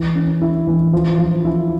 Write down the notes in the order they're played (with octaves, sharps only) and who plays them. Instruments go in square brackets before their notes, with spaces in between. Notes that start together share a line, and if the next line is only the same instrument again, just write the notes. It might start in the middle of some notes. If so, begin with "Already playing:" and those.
Already playing: [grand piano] E3
C#4
E4
E3
F3
F3
E4